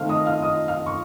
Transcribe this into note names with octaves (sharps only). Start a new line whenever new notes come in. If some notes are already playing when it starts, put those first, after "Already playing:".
Already playing: D#3 A3 C4 F5 F6
D#5 D#6
F5 F6
D#5 D#6
F5 F6
C#6